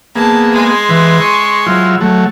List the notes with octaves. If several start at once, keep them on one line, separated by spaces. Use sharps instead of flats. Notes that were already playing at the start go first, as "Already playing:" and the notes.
A#3 B3 G#4 A5
G#3 C6
E3 B4
C#6
F#3 E4 F4
F#3 A3